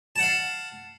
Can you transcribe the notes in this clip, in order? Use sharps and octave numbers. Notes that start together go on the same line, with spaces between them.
F5 F#5 A5